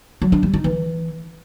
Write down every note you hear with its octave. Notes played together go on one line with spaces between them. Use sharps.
F#3
D4
G3
D#4
E3